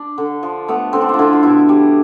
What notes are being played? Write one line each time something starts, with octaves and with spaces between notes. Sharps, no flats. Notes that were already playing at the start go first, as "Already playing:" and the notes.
Already playing: D4
D3
F3
A3 B3
D3 C4
D4
C4 F4
D3 E4
F4
B2 E4
G3